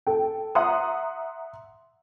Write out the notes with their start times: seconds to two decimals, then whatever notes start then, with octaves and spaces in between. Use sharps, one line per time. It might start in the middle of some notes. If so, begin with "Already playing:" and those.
0.07 A4 G5
0.55 E5 F#5 A#5 C6 D#6